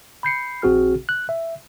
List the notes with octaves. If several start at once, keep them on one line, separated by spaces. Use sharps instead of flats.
B5 G6 C7 C#7
A#1 C4 F#4 G#4 F6
F#6
E5